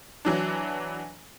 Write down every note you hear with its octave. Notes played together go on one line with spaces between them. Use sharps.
E3 F#3 D4